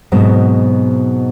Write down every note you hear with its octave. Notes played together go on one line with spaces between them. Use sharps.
G#2 B2 F#3 C4